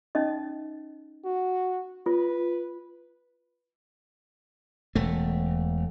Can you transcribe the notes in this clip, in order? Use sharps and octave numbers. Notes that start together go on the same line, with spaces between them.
C#4 D#4 D#5
F#4
F4 B4
E1 A3